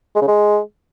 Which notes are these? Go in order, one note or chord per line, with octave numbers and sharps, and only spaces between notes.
G#3
C#3
G#3